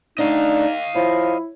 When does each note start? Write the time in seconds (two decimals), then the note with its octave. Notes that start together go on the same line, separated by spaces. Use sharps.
0.18 D2 A3 D4 D#4 D#5 F5
0.95 F3 E4 C#5